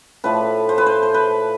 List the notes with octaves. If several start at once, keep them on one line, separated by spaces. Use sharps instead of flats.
A2 F3 A3 B4
C5
B4
C5
C5
B4